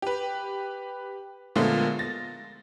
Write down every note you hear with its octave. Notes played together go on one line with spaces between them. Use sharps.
G4 B4
A#2 D3 F3 G#3 A3 B3
A6 A#6